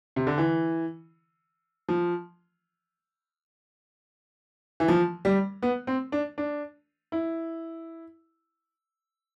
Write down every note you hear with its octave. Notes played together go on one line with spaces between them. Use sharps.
C3
D3
E3
F3
E3
F3
G3
B3
C4
D4
D4
E4